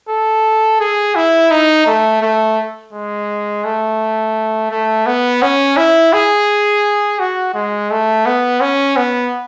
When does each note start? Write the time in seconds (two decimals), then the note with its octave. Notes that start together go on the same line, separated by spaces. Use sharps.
0.09 A4
0.80 G#4
1.15 E4
1.51 D#4
1.87 A3
2.22 A3
2.93 G#3
3.65 A3
4.71 A3
5.06 B3
5.42 C#4
5.77 E4
6.13 G#4
7.19 F#4
7.54 G#3
7.91 A3
8.26 B3
8.61 C#4
8.97 B3